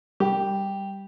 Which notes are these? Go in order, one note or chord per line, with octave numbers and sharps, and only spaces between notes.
G3 G4